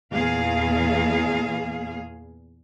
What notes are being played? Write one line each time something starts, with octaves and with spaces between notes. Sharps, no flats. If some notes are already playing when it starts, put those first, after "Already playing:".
E2 A#2 G#4 F5